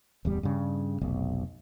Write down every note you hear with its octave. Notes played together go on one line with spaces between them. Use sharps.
D1 E2 G3
G2 C#3
F1 B1